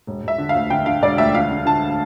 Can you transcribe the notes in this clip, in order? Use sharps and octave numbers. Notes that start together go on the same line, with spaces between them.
E1
E1 E5
D3
F5
D2
D3 G5
D3 F5
E1 D5
D2 E5
D3 F5
D3
D3 A5